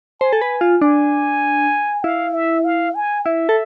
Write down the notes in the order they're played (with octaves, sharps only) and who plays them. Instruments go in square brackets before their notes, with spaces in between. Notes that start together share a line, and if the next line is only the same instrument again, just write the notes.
[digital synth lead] C5 [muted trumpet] G#5
[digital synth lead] A4
B4
F4
[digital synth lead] D4 [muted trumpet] G#5
[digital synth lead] E4 [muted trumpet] F5
[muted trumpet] E5
F5
G#5
[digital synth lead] E4 [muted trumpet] E5
[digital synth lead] A4